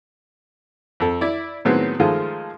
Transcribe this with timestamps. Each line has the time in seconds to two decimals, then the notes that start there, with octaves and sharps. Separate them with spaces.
1.00 F2 A4
1.21 E4 D5
1.65 A2 D#3 F#3 G#3 B3 C4
2.00 D#3 F3 G#3 A3 F4